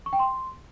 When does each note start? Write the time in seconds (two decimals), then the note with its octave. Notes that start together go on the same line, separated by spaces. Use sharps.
0.06 C#6
0.13 G5
0.19 C6